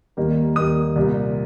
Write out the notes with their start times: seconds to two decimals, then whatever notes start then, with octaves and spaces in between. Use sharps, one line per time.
0.17 D#2 D#3 G3 A#3
0.56 D#2 D#3 G3 A#3 D#6
0.96 C2 A#2 G3 A#3